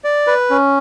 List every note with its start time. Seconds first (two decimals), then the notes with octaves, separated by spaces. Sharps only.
0.04 D5
0.27 B4
0.50 C#4